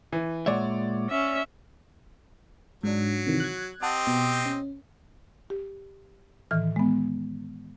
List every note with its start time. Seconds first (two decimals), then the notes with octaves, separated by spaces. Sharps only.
0.12 E3
0.46 A#2 G#3 C#5 D5 E5 F#5
1.10 C#4 E5
2.83 G#2 F#3 D4
3.27 C3 D#3 E3
3.40 F#6 G#6
3.83 C4 G4 D#5 F#5 A5
4.07 B2
4.46 C#4
5.50 G4
6.51 A2 D#3 E3 F6
6.76 G#3 B3